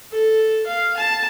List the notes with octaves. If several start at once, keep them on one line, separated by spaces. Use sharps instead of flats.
A4
F5
A5